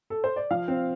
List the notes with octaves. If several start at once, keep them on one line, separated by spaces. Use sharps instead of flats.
A4
C5
D5
F3 F5
C4